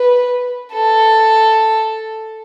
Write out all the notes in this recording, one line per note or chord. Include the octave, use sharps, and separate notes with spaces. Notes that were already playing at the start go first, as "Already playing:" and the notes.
Already playing: B4
A4